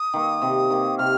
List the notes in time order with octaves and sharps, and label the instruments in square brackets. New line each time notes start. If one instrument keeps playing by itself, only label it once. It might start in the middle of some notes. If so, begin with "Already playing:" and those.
Already playing: [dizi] D#6
[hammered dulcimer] D#3 A#3
C3
D#3 A#3
[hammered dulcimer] C3 [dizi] F6